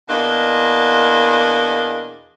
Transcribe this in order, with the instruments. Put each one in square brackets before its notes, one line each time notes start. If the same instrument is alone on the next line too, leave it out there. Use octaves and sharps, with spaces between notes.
[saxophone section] E2 B2 A#3 D4 D#5